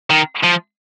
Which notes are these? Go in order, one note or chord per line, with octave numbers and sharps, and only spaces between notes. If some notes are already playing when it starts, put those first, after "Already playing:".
D#3
F3